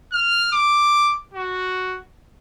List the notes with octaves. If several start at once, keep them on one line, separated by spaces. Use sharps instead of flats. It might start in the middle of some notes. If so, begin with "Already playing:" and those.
F6
D6
F#4